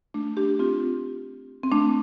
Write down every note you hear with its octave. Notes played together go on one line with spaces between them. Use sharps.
A3 D4
D4 G4
C4 F4
C4
A3 D4